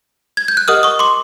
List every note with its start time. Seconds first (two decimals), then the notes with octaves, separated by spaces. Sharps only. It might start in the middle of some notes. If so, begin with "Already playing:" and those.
0.37 G#6
0.48 G6
0.57 F#6
0.68 G4 A#4 D#5 F#5 D#6 F6
0.83 C#6 D#6
0.99 C6 D6